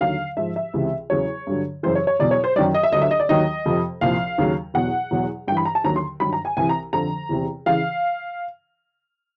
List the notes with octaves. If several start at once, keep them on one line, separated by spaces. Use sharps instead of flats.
D#2 D3 F#3 F5
G#2 F3 E5
E5
C#2 C3 E3
E2 C#3 F#3 C#5
G2 D3 F#3
F#2 C#3 E3 C5
C#5
C#5
E2 B2 F#3 D5
C#5
C5
F#2 D#3 F#3 D5
D#5
E5
D2 D3 F#3 D#5
E5
D#5
D5
D#2 D#3 F#3 D#5
F2 C3 F3
C2 A#2 F3 F5
D#2 C#3 F#3
E2 B2 F#3 F#5
E2 B2 F#3
G2 E3 G5 B5
A#5
A5
D#2 D3 F#3 A#5
C6
G2 D#3 F#3 B5
A#5
G#5
C2 C3 E3 G#5
A#5
F2 D3 F3 A#5
E2 C3 E3
C#3 E3 F5